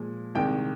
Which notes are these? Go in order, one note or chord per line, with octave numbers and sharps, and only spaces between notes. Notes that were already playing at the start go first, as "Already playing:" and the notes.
Already playing: A#2 F3 G#3
C2 C3 D#3 G#3 G5